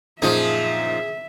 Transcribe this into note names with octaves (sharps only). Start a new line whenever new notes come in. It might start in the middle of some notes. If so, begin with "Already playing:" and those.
F#2 A#2 F3 D#4 G#4 E5